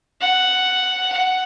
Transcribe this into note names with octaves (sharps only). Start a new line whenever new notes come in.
F#5
F#5